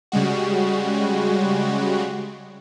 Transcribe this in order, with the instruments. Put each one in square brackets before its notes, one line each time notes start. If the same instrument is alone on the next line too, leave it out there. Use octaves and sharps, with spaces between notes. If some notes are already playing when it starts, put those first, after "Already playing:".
[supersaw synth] C#3 G3 G#3 F#4